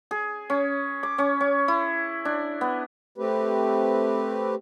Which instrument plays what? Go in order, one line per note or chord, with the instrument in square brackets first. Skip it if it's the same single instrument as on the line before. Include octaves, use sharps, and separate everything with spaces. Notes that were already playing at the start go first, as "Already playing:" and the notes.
[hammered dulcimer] G#4
C#4
D6
C#4
C#4
E4
D4
B3
[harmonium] A3 C4 G4 B4